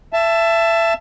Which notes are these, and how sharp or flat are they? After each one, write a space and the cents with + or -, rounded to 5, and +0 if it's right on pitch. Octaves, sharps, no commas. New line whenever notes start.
E5 +25 A5 +0